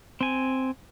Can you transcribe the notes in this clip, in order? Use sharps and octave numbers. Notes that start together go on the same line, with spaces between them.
C4 G#5